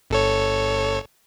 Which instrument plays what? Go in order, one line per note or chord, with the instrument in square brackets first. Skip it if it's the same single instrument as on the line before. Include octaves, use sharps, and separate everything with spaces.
[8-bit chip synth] G1 A4 C#5